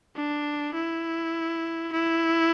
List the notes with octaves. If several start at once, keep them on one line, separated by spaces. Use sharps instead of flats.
D4
E4
E4